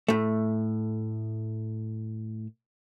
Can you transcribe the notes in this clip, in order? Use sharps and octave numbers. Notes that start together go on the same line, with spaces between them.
A2 A3